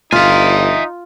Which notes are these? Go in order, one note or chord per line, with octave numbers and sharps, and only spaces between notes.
G1 D#4 F4 E5 G#5